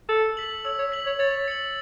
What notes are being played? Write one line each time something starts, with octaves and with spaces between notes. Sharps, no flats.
A4 E6
B6 F#7
C#5 E6
C#5
B6 F#7
C#5
C#5 A6
C#7 F#7